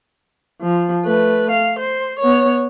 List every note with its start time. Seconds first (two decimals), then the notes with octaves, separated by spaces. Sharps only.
0.61 F3
1.05 A3 B4
1.51 F5
1.79 C5
2.19 B3 C#5